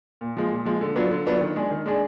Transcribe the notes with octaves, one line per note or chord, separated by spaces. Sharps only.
A#2
F3 G#3
A#2
F3 G#3
D3
F#3 B3 D4 F4
D3
F#3 B3 D4 F4
D#3
G#3 D4 G#4
D#3
G#3 D4 G#4